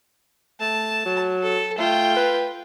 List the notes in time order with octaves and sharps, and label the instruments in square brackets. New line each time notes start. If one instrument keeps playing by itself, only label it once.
[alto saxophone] A3 [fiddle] A5
[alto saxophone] F#3
[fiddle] A4
[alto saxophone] A3 [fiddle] F4 G5
[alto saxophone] B4